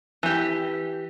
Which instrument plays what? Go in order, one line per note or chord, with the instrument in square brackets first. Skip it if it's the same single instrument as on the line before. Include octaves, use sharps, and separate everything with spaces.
[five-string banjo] E3 G4